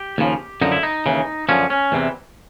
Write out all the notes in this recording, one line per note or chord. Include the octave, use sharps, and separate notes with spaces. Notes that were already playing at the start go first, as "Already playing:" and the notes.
Already playing: G4
D#2 C#3 F3
F#2 D3 F3 D#4
E4
D#4
D#2 C#3 E3
F#2 D3 F3 C#4
C#4
E2 C3 E3